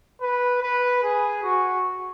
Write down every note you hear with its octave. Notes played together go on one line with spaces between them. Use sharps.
B4
B4
G#4
F#4